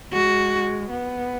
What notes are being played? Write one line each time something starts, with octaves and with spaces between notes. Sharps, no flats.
G#3 F#4
B3